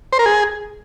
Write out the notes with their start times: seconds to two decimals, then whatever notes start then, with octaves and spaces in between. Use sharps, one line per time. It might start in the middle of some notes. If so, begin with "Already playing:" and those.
0.13 C5
0.19 A#4
0.26 G#4